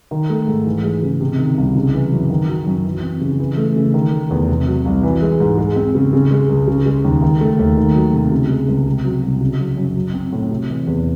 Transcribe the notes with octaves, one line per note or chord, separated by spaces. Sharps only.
D#3
A3
G#2
E3
G#3
C#3
C3
D#3
C2
C#3
E3
F#2
D#3
F#3
F#2
E3
C4
C#3
E3
A3
C#3
D#3
A3
E2
C3
F#3
C2
E3
G#3
G#2
G#3
C4
C#3
C#3
G#3
C#2
C#3
G#3
D#2
D#3
A3
D#2
D#3
F#3
C3
C#3
G#3
C#2
C3
F#3
C2
C#3
F#3
F#2
F#3
C4
A2
C3
E3
E2